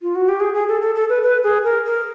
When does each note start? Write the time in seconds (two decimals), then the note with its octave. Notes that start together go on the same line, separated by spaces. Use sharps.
0.02 F4
0.15 F#4
0.28 G4
0.40 G#4
0.54 G#4
0.69 A4
0.81 A4
0.95 A4
1.09 B4
1.23 B4
1.44 G#4
1.64 A#4
1.85 A#4